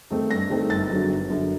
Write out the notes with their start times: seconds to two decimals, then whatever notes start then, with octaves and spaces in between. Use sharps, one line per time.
0.10 D#3 A3 C4 D#4
0.31 G2 A#6
0.50 D#3 A3 C4 D#4
0.70 G1 A6
0.90 F#2 D3 F#3
1.09 G1
1.30 F#2 D3 F#3